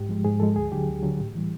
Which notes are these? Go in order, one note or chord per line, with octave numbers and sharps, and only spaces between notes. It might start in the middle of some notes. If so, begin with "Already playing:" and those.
Already playing: G#2 G4
F3 G#3
G#2 G#4
F3 G#3 A4
D2 G#4
D3 F#3 G4
D2
D3 F#3
A2
E3 G3